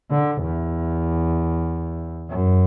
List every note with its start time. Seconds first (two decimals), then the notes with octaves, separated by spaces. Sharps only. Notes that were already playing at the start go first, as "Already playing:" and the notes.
0.11 D3
0.42 E2
2.30 F#2